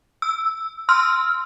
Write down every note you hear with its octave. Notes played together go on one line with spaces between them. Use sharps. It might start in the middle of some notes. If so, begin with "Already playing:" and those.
E6
C6 E6 F6